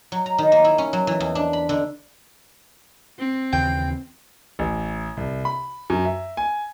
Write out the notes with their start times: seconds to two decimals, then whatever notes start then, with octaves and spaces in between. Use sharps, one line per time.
0.12 F#3
0.26 A#5
0.38 D#3
0.52 A#3
0.64 E4
0.78 C#4
0.93 F#3
1.07 E3
1.20 E2
1.35 D4
1.53 B5
1.69 D3
3.19 C4
3.53 D#2 C#3 E3 G5
4.59 A1
5.17 C2
5.45 B5
5.90 F#2
6.05 E5
6.37 G#5